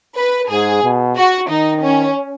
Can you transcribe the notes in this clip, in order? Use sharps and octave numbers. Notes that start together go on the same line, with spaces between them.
B4
G#2 G#4
B2
F#4
D#3 D#4
C#4